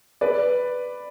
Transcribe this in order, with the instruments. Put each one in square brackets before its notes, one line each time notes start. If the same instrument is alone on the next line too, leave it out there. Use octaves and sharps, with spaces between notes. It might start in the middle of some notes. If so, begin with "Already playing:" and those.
[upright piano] B4 D5